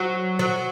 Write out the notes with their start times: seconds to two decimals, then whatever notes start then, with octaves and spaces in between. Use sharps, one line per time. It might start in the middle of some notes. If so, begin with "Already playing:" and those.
Already playing: F#3
0.39 F#3